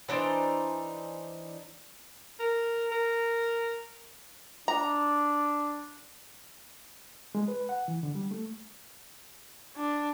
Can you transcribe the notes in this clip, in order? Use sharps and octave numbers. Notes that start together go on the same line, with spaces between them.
E3 D4 D#4 C5
A#4
A#4
D4 A#5
G#3
B4
F#5
E3
D3
G3
A3
D4